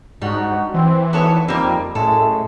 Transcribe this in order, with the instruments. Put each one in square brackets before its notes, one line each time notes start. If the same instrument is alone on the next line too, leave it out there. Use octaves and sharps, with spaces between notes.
[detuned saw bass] G#2 [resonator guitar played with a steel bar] G3 [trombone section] D4 D#4 F#4
[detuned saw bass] E3 [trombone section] C4
[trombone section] G#1 [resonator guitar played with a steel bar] B3 A4 C#5
[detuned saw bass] F2 [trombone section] D#3 F3 G3 [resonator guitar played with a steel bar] A#3 C4
[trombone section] F#2 G#3 A3 [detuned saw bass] A2 [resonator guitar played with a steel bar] A4